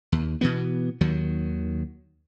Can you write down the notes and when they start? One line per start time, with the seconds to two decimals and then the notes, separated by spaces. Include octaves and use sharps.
0.12 D#2
0.41 B2 E3 B3
1.01 D#2 D#3 F#3